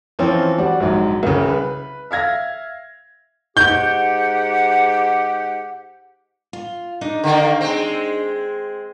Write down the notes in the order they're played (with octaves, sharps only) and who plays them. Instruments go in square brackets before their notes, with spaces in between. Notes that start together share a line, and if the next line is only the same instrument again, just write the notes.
[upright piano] E3 F3 C4 C#4 F4
G3 F#4 D5
A#1 G#2 F#3
C2 C#3
B4
E5 F5 G#6 A#6
[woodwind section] G#2 G4 F#5 [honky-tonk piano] G6
[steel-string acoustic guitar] F4
D4 D#4 G#4
[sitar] D3 D#3 A#3
G#3 C4